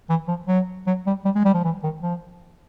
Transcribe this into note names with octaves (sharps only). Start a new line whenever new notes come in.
E3
F3
F#3
F#3
G3
G3
G#3
G3
F3
E3
D#3
F3